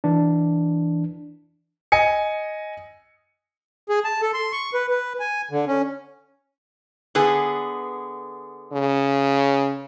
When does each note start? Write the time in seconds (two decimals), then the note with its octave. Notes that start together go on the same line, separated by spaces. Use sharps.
0.04 E3 D4
1.92 D#5 G#5 C#7
3.89 G#4
4.04 A5
4.22 A4
4.34 C6
4.52 C#6
4.74 B4
4.90 B4
5.20 G#5
5.51 D3
5.68 C#4
7.15 D3 B3 G#4
8.73 C#3